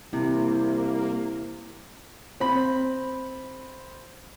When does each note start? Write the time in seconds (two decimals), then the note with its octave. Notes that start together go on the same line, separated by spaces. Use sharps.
0.13 C2 C3 A#3 E4
2.40 C4 B5